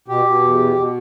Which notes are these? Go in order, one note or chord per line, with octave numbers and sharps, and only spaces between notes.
B2 G4
B2
E2
B2
B2